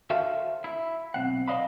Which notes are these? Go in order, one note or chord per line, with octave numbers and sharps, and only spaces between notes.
F#4 A4 C5 E5 F5
E4
B1 C4 F#5
C5 D5 D#5 F5 B5